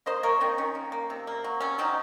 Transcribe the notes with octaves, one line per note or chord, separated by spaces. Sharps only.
A#3 C5 D#5
A#3 A#4 C#5
D#3 C4 D#4
D#3 C#4
A#3
A#3
C3
A#3
F#3
C3 C#4
F#3 C4 D#4